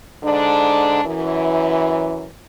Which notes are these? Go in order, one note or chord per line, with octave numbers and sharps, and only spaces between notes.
G#2 D3 D4
F#2 E3